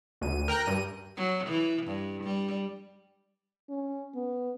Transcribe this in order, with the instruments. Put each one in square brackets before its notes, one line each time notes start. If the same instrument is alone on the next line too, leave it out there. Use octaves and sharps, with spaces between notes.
[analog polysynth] D2 D#7
A#4 G5 A#5 F#6
G2 D#7
[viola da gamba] F#3
E3
G2
G3
[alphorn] C#4
B3